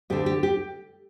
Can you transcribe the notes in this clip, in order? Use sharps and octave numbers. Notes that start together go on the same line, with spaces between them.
D2 D3 G4
G4
G4